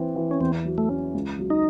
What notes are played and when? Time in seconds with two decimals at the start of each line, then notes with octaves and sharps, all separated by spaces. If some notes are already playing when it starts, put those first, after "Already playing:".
Already playing: E3 C4
0.16 E3
0.31 C#4
0.41 E2 C4
0.65 F#3
0.78 A3
0.89 C#4
1.14 C#2
1.39 F#3
1.50 D#4